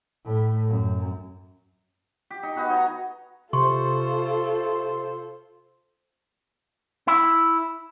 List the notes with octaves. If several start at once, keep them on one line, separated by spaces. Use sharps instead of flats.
A2
F#2
G4
D#4
B3 D#4 F#4 G#4
C#5 A#5
C3 F4 A4 C5 C6 C#6
E4